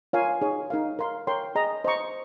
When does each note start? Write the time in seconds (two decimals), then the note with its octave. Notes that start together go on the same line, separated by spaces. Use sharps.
0.13 F4 A#4 C#5 F5 G#5
0.42 D#4 G#4 C#5
0.70 D#4 A#4 F5
0.99 A#4 F5 C6
1.27 A#4 C#5 G5 C6
1.55 G#4 D#5 A#5
1.84 C5 D#5 A#5 C#6